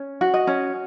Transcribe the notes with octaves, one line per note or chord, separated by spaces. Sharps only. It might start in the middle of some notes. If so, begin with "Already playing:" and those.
Already playing: C#4
F#4
D#5
C#4